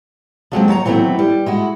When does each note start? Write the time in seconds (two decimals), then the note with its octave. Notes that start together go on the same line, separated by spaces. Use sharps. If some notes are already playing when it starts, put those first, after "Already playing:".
0.52 F3 F#3 G#3 C4
0.68 F#3 C#5 A5 A#5
0.85 D#3 E3 F#3 A3 B3 C4
1.19 G3
1.46 G#3 E4 F#4